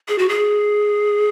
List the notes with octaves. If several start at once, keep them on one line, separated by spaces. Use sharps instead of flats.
G#4
F#4
G#4